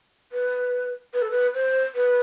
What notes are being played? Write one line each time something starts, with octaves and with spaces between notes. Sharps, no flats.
B4
B4
A4
B4
C5
B4